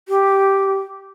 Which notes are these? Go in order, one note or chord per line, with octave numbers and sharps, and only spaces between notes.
G4